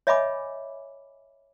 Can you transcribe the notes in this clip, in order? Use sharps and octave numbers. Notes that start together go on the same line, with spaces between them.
C#5 D#5 E5 G#5 B5 D6